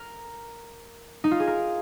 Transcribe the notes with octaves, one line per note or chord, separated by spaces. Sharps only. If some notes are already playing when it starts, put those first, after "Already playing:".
Already playing: A#4
D#4
F4
G#4
A#4